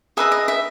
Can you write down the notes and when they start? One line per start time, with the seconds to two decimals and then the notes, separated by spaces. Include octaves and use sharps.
0.17 G#4 B4 D#5 E5
0.32 D#5
0.48 E5